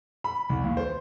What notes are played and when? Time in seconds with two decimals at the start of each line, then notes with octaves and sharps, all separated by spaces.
0.24 B5
0.50 C2
0.64 D#2
0.77 C5